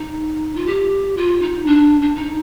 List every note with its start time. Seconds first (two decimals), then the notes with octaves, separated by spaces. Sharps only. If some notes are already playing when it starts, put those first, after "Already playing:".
Already playing: D#4
0.55 F4
0.66 G4
1.16 F4
1.41 D#4
1.66 D4
2.01 D4
2.15 D#4